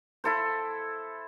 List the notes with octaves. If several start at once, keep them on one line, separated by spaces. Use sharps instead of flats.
E4 A4 C5